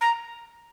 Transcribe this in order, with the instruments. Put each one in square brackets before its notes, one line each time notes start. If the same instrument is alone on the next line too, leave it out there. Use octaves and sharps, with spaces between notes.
[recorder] A#5